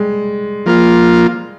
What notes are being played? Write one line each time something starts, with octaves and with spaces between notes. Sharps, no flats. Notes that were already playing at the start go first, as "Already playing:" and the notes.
Already playing: G3 G#3
F3 A#3 F4